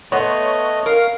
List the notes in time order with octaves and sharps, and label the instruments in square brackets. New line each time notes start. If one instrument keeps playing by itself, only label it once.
[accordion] A3 [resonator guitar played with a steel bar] B3 [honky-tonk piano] C#5 F#5 C6 [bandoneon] D#5
[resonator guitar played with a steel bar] A#4 [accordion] F5